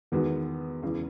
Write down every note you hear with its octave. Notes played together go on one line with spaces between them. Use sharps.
E2 D#3 G#3 B3 F#4
E1 E2 C#3 E3